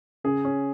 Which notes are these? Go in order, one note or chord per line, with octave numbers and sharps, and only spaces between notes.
C#3 G#4
C#4